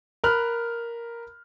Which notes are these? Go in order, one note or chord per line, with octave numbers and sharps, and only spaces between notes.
A#4 B5 F6 F#6